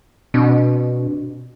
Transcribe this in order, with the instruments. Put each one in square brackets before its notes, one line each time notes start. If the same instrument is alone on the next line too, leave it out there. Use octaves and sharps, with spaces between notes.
[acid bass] B2 [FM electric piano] C4 D4